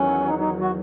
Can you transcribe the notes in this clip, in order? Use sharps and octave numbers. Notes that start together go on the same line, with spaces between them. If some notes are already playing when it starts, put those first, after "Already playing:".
Already playing: E2 D#3 F#3 C#4
D#4
D#4
F#4